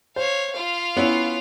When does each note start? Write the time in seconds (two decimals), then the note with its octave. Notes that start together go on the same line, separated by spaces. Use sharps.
0.16 C5 C#5 F5
0.53 F4 F5
0.97 B3 C#4 E4